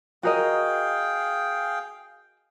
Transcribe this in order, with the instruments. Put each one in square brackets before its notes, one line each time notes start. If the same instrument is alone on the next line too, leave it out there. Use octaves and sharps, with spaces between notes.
[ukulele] F#4 A#4 D#5 [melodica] G#4 F5 G5